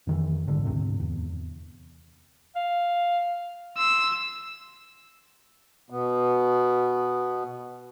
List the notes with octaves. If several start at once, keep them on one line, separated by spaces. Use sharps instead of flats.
F2 D#3 E3
A#1 G#2 D3 D#3
D2 G#2 C3
E2
F5
C6 E6
B2 B3